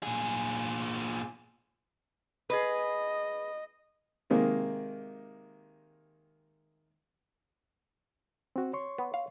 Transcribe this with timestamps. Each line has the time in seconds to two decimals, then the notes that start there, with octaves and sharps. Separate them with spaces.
0.03 A#2 G#4
2.50 G#4 B4 D#5
4.30 C3 D#3 G#3 A#3
8.56 C4 F#4
8.73 C#5 C6 C#6
8.98 B3
9.14 F5